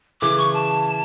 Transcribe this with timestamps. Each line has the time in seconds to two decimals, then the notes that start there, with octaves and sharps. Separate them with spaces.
0.21 C#3 E3 D6
0.38 C#6
0.54 A5